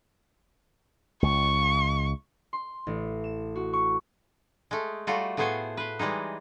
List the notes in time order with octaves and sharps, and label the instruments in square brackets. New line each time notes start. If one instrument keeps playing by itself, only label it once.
[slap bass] C#2 [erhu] C#6
[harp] C6
A1
E7
F#4
C#6
[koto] G#3 A3
G3 A3 F4 F#4
A2 A3 B3 G#4 C5 G#5
B4 C5
E3 G3 G#3 D#4